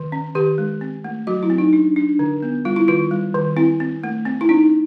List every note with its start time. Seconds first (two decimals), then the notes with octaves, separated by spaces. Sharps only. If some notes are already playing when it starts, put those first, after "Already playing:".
Already playing: D#3
0.12 C#4
0.35 D#3 G4
0.58 G#3
0.81 C4
1.04 A3
1.27 F#3 F#4
1.43 E4
1.50 C4
1.58 D#4
1.73 D4
1.96 D4
2.19 D3
2.43 B3
2.65 G3 F4
2.76 E4
2.88 D#3 F4
3.11 G3
3.35 D#3
3.57 C4 E4
3.80 C4
4.04 A3
4.25 C4
4.41 E4
4.49 C#4 D#4